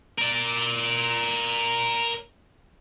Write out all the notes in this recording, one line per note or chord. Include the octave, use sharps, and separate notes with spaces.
A#4 D5